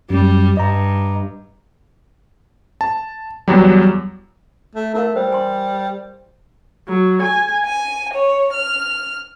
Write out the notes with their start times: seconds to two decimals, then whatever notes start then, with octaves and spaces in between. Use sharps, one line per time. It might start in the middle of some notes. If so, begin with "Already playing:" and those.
0.10 F#2 G3
0.57 G2 D#5 A#5
2.81 A5
3.48 E2 F#3 G3
4.75 A3
4.94 A3 E4 A#4 F5
5.16 G3 C5
5.32 G#5 C6
6.89 F#3
7.23 G#5
7.66 G#5
8.14 C#5
8.53 F6